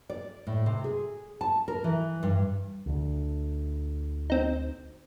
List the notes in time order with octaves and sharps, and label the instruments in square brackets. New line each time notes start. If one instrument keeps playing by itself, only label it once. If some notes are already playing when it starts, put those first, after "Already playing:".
[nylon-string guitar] D5
A2
C3
G#4
A5
A#4
E3
G2
[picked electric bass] D2 D3
[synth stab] C4 D#4